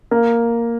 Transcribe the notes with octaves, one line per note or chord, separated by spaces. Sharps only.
A#3